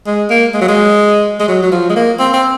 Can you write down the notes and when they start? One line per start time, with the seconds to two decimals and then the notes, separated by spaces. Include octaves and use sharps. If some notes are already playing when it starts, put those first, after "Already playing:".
0.06 G#3
0.30 A#3
0.54 G#3
0.61 F#3
0.68 G#3
1.40 G#3
1.48 F#3
1.63 F#3
1.72 F3
1.90 G#3
1.96 A#3
2.19 C4
2.33 C4